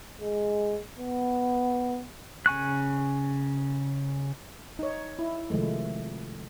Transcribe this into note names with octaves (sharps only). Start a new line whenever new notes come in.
G#3
B3
C#3 G#5 C#6 F#6
D#4 C#5
E4
C3 D#3 F3 G#3 A3